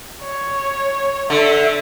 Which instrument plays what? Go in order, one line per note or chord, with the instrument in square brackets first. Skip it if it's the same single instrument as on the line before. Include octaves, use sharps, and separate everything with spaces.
[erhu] C#5
[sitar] D3 [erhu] E5